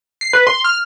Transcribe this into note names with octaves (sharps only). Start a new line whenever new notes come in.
C7
B4
C6
F6